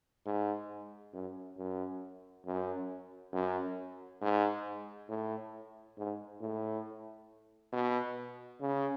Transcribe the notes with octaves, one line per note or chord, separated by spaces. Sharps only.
G#2
F#2
F#2
F#2
F#2
G#2
A2
G#2
A2
B2
C#3